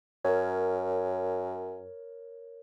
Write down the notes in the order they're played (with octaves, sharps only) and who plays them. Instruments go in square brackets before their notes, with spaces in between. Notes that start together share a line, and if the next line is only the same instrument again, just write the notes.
[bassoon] F#2 [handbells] A#4 C#5